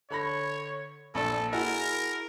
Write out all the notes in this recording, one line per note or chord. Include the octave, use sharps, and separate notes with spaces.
D3 C#5 B5 A#6
A#1 A#2 D4 A4
E4 F#4 G#4 A#4